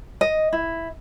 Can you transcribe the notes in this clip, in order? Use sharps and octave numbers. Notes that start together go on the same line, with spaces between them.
D#5
E4